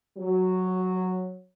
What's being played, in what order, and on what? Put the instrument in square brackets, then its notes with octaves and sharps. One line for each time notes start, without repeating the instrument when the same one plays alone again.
[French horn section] F#3